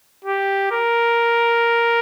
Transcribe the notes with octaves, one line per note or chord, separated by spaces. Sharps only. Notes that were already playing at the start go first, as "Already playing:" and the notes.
G4
A#4